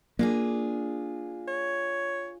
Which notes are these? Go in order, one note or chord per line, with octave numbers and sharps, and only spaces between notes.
A#3 D4 F4 G#4
C#5